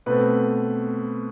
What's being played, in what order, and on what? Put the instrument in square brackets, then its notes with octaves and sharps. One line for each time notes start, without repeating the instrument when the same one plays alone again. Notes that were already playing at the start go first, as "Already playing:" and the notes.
[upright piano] B2 A3 C4 B4